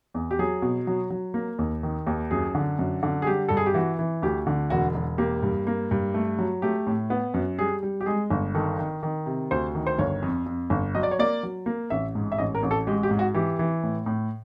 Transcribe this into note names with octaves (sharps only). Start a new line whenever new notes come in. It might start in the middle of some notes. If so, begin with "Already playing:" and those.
E2
G4
F#3 G#4
B2
F#3
F#3
A#3
D#2
D#3
D#2
F#2 G#4
D3
F#2
D3
G#4
G3 G4
G2 A4
G#4
G4
E3 F#4
E3
D2 G4
D3
E1 F#4
E1
A#3 G4
G2
A#3
G2
A3
F#3
A3 G4
A2
B3
F#2
G3 G#4
G3
G4
G#3 G#4
G1
D#3 A4
D#3
D#3
C3
D2 C5
D#3
C5
G1 C#5
F2
F2
G1
F#3 D#5
D5
C#5
A#3 D5
F#3
A#3
A1 E5
G#2
E5
A1 D#5
A#4
A1
A4
G#3 G4
G4
G#2
F#4
E3 G4
E3
A2
A2